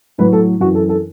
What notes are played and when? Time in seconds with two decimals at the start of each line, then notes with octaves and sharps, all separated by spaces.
0.18 A2 F#3 B4
0.32 A4
0.60 F#2 E3 F#4
0.75 A4
0.89 A4